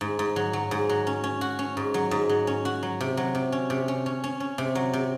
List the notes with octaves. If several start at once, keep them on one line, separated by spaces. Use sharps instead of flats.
G#2
G#2
F#3
F#3
G#2
F#3
C#4
C#4
F#4
C#4
G#2
F#3
G#2
F#3
C#4
F#4
F#3
C3
F#3
C3
C#4
C3
C#4
C#4
C#4
C#4
C3
F#3
C3